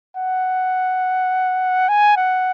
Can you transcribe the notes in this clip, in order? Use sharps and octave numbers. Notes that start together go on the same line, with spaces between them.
F#5
G#5
F#5